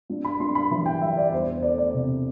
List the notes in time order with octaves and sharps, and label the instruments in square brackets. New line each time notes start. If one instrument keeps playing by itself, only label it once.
[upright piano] G2
B5
G2 C6
B5
E3 B5
G5
G3 E5
D5
E2 C5
C5
A3 D5
D5
C3